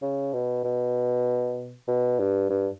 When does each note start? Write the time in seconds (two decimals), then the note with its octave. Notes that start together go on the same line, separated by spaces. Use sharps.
0.02 C#3
0.34 B2
0.64 B2
1.88 B2
2.19 G2
2.50 G2